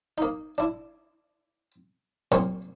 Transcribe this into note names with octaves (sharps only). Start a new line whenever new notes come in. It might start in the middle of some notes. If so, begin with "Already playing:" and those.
A#3 D#4
D4 E4
C2 F#2 A#2 C#6